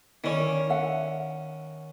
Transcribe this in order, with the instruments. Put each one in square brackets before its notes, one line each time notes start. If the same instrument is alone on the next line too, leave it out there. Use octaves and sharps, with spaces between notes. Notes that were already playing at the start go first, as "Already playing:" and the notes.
[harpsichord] D#3 C#4 [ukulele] E4 D5
[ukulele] E5 F#5